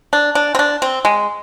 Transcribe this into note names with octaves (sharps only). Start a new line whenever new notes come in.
D4
D4
C4
D4
C4
G#3